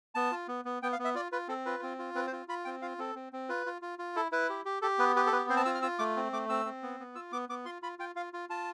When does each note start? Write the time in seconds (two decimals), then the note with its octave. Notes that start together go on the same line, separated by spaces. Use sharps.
0.15 B3 A5
0.31 F4
0.48 B3
0.65 B3
0.83 B3 G5
0.93 F5
0.99 B3
1.05 E5
1.15 F4 D5
1.32 F4 B4
1.48 C4 A4
1.66 F4 B4
1.83 C4
1.99 F4
2.15 C4 B4
2.27 C5
2.33 F4
2.48 F4 B5
2.65 C4 G5
2.82 F4 F5
2.98 C4 A4
3.15 C4
3.33 C4
3.49 F4 B4
3.66 F4
3.82 F4
3.99 F4
4.16 E4 A4
4.32 E4 B4
4.50 G4
4.65 G4
4.82 G4 A4
4.99 B3 B4
5.16 G4 B4
5.27 A4
5.32 B3 B4
5.49 C4 C5
5.57 A5
5.65 F4 E6
5.75 F6
5.82 F4 E6
5.99 A3 D6
6.16 C4
6.32 A3 D6
6.49 C4 E6
6.65 C4
6.83 B3
7.00 B3
7.15 F4 E6
7.32 B3 D6
7.49 B3 D6
7.65 F4 C6
7.82 F4 B5
7.99 F4 G5
8.15 F4 F5
8.33 F4
8.49 F4 A5